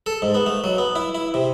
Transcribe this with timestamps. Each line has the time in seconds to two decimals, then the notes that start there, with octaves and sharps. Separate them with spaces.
0.06 A4
0.22 G#2
0.35 B3
0.46 A3
0.64 F#3
0.78 B3
0.96 E4
1.15 E4
1.34 C3